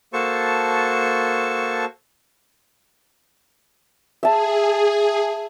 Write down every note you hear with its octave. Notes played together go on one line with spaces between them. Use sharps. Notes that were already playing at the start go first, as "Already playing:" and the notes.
A#3 F#4 A4 C5 A5 C#6
G#4 E5 A5